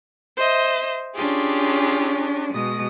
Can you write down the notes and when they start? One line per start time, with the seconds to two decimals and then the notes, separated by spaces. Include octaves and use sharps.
0.37 C5 D#5 E5
1.15 C#4 D4 F4 G4 G#4
2.52 B2 G#3 D#6